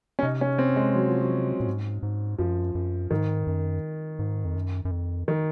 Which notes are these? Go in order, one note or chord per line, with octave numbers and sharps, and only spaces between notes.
C#4
C3 D#4
C#4
C4
G#3
F#3
F3
F#3
A#2
G#2
G#2
F#2 F3
F#2
G#2 D#3
F#2
G#2
F2
F#2
F#2
F2
D#3